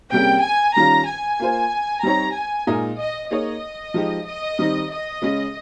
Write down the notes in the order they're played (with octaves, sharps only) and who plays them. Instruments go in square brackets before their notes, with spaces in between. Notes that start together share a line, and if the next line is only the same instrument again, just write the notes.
[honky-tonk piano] C3 G3 A#3 C#4 G#4 [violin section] G5
[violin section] G#5
[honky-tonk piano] D#3 G3 C#4 F4 [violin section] A#5
[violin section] G#5
[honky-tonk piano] A#3 F4 C5
[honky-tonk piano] G3 C4 D#4 G4 C#5 [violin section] A#5
[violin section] G#5
[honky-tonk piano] A#2 G#3 D#4 A#4 D#5
[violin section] D#5
[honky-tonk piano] A#3 D#4 G#4 C#5 [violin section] D#5
[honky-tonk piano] F3 G#3 D#4 G4
[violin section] D#5
[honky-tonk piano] D#3 G3 C4 D#4
[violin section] D#5
[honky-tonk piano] C#3 G#3 C#4 G#4